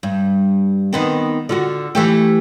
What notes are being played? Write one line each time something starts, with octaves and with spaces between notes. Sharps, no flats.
G2
D#3 B3 C4
D3 F4 F#4
E3 A3 G4